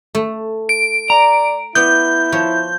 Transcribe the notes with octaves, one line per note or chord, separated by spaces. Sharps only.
A3
D7
D5 A#5
B3 E4 B4 D5 G6
F3 C5 C#5